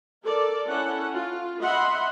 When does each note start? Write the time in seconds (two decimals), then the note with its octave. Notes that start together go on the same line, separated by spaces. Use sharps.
0.22 A4 A#4 D5
0.68 C#4 E4 A4 F#5
1.13 F4
1.60 D#5 E5 F#5 B5 C6